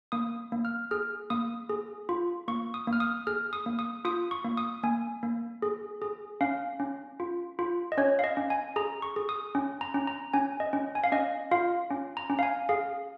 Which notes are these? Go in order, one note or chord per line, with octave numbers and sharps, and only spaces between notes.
A#3 D#6
A#3
F6
G#4 F6
A#3 D#6
G#4
F4
A#3 C#6
D#6
A#3
F6
D#6
G#4 F6
D#6
A#3
D#6
F4 D#6
C#6
A#3
D#6
A#3 G#5
A#3
G#4
G#4
C#4 F5
C#4
F4
F4
D#5
C#4 C#5
F5
D#5
C#4
G#5
G#4 A#5
C#6
G#4
D#6
C#4
A#5
C#4
A#5
C#4 G#5
D#5
C#4
G#5
F5
C#4 D#5
F4 F5
C#4
A#5
C#4
F5
G#5
G#4 F5